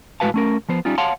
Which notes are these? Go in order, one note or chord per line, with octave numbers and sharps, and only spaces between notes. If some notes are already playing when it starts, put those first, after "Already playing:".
A2 G#3 F#4 B4 F5 A5
A3 C#4 A#4
F3 B3 C5
G3 C#4 D#4 F4
C#5 F5 F#5 A5 C6